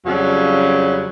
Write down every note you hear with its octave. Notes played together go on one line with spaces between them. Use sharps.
F2 C#3 F#3 G3 C#4